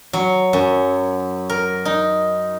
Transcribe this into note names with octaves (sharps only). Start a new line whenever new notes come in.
F#3
F#2
A#4
D#4